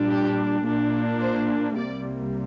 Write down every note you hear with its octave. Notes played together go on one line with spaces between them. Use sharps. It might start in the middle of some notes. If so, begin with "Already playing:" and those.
Already playing: A#2 G3 D4
G4
A#2 A#3 D4
C5
C2 C3 G3 A#3 D5